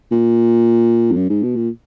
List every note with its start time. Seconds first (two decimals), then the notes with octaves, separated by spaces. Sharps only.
0.12 A#2
1.12 F2
1.17 F#2
1.30 G#2
1.43 B2
1.56 A#2